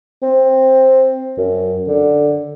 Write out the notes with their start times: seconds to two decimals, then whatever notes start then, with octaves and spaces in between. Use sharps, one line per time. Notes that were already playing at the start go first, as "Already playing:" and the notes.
0.23 C4
1.38 F#2
1.87 D3